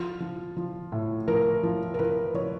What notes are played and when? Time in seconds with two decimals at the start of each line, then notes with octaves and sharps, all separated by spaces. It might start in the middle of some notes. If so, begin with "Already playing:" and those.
Already playing: F3 F4
0.20 F3
0.57 F3
0.92 A2
1.28 F3 A#4
1.63 F3
1.94 A#4
1.99 F3 B4
2.34 F3 C#5